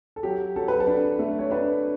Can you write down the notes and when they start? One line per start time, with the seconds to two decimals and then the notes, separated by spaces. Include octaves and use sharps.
0.16 A4
0.23 F#3 G4
0.56 F#3 A4
0.68 B4
0.80 A4
0.87 D4
1.19 A3
1.39 C#5
1.51 D4 B4